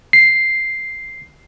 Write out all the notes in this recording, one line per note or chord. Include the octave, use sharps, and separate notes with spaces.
C7